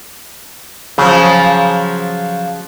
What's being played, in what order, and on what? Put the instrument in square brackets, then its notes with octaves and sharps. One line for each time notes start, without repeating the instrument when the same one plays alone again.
[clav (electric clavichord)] C#3 [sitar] F3 F#3